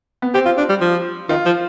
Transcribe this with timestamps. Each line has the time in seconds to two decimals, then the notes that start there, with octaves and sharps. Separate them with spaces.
0.22 B3
0.34 C4 G4
0.45 F4
0.58 D4
0.69 G3
0.81 F3
1.29 D#3 F4
1.46 F3